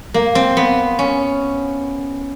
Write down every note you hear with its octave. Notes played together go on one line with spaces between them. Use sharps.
A#3
C4
B3
C#4